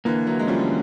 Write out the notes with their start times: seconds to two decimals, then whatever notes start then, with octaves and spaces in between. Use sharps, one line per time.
0.05 D3 E3 A#3
0.27 E3 F#3
0.39 G#3
0.47 F3 G3 C#4
0.59 D3